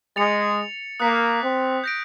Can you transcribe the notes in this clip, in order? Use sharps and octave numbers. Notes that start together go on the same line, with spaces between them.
G#3 A6 C#7 F7
A#3 D#6 F#6 B6
C4
G6 A#6 D7